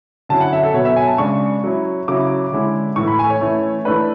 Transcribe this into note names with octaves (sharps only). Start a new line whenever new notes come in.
D3 F#3 C#4 E4 A5
F#5
E5
A4
B2 F#3 B3 C#5
E5
G#5
A5
C#3 G#3 D4 C#6
F#3 C#4 E4
C#3 F#3 C#4 E4 D6
D3 G#3 C#4 E4
A2 E3 A3 C#6
B5
G#5
C#5
E3 A3 C#4 E4
E3 A3 D4 B4